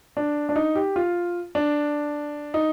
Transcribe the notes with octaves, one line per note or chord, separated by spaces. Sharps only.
D4
D4
D#4
G4
F4
D4
D#4